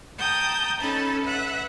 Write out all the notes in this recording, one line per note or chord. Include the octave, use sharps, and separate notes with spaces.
G5 A5 A#5 D#6 G6
C#4 D#4 A4 A5 B5
B4 E5 F#5 F#6